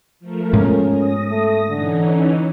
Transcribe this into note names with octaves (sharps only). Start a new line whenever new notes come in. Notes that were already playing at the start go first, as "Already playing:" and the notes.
F3 A3 A#4
G#2 B2 G#3 C#4
D#6 A#6
A3
D3 E3 C#4 D#4